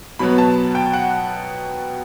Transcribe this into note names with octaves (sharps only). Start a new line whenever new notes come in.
B2 F#3 B3 B5
A5
G5
F#5